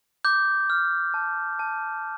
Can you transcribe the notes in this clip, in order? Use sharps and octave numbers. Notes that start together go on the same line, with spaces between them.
D6 G6
F6
A5
A5